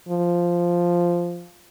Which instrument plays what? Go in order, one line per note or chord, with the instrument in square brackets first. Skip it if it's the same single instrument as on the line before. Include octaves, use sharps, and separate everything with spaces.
[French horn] F3